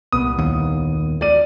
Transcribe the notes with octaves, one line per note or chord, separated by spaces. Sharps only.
C2 A#2 B3 D#6
D#2
D5 D#7